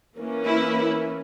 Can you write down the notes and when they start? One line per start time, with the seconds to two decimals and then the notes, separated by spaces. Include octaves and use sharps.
0.17 E3 A#3 C#4
0.45 E4